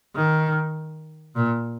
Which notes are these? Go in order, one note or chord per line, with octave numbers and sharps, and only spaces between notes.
D#3
A#2